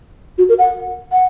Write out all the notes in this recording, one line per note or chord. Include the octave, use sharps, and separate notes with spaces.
F#4
A#4
F#5
F#5